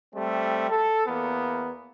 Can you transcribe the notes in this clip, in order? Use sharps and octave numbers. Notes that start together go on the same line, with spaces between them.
G3 A3 C4
A4
E2 A#3 B3